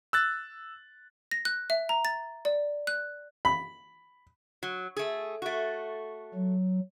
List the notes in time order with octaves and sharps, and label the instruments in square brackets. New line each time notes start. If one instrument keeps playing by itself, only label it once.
[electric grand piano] E6 F#6 A6
[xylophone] A#6
F#6
E5
A#5
A6
D5
F#6
[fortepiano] B5
[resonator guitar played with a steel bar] F#3
A3 G#4
A3 F#4
[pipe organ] F#3